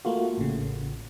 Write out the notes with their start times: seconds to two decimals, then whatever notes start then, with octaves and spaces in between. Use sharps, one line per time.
0.05 A3 A#3 F4 F#4
0.38 A1 C#3